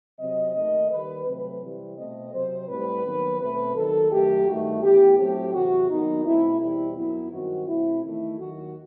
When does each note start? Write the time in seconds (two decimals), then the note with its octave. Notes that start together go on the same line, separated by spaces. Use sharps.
0.19 C3 F#3 C4 D#5
0.54 D#2 D#3 A3 D#5
0.90 D#2 D#3 G3 B4
1.25 C3 F#3 A3 C4 B4
1.61 C3 E3 G3 C4
1.96 B2 A3 C4 D#5
2.33 C3 F#3 C4 C5
2.68 A2 G3 C4 B4
3.04 D#2 D#3 F#3 B3
3.40 B2 A3 C4 B4
3.75 D#2 D#3 F#3 A4
4.11 F#2 D#3 A3 G4
4.46 G2 D#3 A3 F#4
4.81 A2 E3 B3 G4
5.18 A2 F#3 A3 C4 G4
5.53 E2 C3 F#3 F#4
5.89 D#2 D#3 F#3 B3 D#4
6.25 B2 A3 C4 E4
6.60 E2 B2 G3 C4 E4
6.96 F#2 F#3 B3 E4
7.31 G2 D#3 F#3 C4 F#4
7.67 B2 A3 C4 E4
8.02 E2 D#3 A3 E4
8.38 D#2 D#3 F#3 F#4